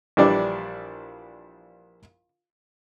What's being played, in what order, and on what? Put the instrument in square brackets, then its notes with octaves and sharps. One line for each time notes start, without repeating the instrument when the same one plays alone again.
[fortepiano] A#1 E3 G3 D4 D5